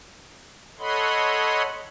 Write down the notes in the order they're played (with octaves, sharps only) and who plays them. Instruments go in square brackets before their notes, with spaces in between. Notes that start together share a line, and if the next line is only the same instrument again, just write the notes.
[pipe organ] A4 C#5 D#5 F#5 B5 C6